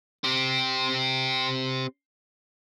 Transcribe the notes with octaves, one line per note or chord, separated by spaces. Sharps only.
C4 G4